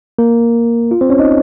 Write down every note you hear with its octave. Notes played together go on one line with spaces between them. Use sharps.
A#3 A#4
F4
C4 C5
C#4 C#5
D#4 D#5